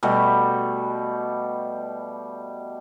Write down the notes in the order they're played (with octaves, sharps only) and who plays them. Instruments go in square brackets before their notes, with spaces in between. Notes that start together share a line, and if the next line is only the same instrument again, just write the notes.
[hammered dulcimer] B2 G3 A3